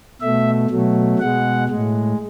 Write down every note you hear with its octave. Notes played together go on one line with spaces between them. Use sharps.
B2 A3 E5
B2 F#3 A3
B2 G#3 F#5
A2 G#3